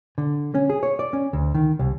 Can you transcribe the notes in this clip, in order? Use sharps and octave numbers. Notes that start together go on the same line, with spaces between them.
D3
C#4
G#4
C#5
D5
C#4
D2
D#3
C2